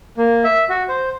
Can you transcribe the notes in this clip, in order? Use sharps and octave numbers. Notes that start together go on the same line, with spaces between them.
A#3
E5
F#4
C5